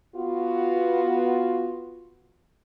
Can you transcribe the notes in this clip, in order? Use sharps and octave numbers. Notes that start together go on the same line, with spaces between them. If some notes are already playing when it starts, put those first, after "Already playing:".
B3 F4 F#4